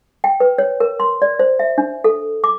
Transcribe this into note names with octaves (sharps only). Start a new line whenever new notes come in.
G5
B4
C#5
A#4
C6
D5
C5
E5
D4
A4
D6